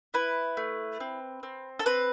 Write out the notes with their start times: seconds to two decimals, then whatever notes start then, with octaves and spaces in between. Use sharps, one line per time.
0.14 E4 B4
0.57 A3
1.00 C4
1.43 C4
1.79 A4
1.86 C4 B4